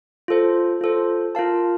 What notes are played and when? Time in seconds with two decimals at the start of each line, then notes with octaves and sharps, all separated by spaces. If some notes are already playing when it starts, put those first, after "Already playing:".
0.28 F4 A4 C5
0.81 F4 A4 C5
1.35 F4 A#4 F5 A5